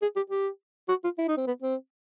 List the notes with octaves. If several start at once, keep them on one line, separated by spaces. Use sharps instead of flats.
G#4
G4
G4
F#4
F4
E4
D#4
C4
B3
C4